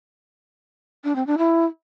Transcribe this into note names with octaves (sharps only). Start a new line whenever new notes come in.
D4
C4
D4
E4